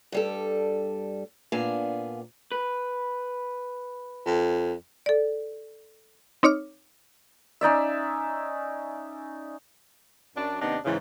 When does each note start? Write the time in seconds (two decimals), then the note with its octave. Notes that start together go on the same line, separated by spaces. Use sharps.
0.12 G2 G3 A4
1.52 A#2 B3 D4 F5 G#5
2.52 B4
4.26 F2
5.06 A4 D5
6.43 C4 D#4 C#5 D6 F6
7.61 C#4 D#4 D5 E5
10.36 F#2 D4
10.60 D#2 C3 B3 D4 D#4 D#5
10.85 G#2 C#3 E3